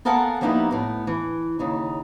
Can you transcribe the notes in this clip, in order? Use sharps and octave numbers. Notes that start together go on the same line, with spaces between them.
B3 A4 A#4 F5 F#5 G#5
F3 G3 A#3 B3 D#4 E4
A2 B3
E3
D#2 C#3 D#4